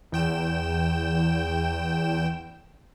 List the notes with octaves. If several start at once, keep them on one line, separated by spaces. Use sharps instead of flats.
E2 G5 E7